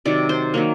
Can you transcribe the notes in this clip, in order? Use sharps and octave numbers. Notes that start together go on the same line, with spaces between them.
C3 D#3 F#3 D5
C5
D#3 F#3 A#3